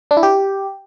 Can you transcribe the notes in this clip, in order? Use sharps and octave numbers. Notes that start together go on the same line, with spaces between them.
D4
E4
G4